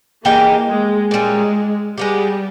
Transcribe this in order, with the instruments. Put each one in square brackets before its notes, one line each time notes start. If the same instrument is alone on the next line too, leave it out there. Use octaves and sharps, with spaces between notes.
[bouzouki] E3 G#3 D#4 G4 [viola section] A#3
[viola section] G#3
[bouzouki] A#2 G3 C#4 [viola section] G#3
[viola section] G3 [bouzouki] G#3 B3 G4